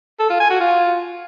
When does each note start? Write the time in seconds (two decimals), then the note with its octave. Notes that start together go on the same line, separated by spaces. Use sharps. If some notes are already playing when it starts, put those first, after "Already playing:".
0.20 A4
0.30 F4
0.40 G#5
0.50 F#4
0.60 F4